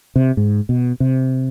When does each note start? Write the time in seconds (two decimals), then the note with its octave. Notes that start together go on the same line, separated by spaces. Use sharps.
0.16 C3
0.37 G#2
0.69 B2
1.00 C3